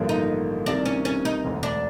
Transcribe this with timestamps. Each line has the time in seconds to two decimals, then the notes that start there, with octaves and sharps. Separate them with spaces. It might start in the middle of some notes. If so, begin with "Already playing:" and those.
Already playing: A1 G2 D3 F3 A#3
0.09 D#4
0.66 C2 C3 D#3 D4
0.85 C#4
1.05 C#4
1.25 D#4
1.44 E1 D2 D3
1.63 D4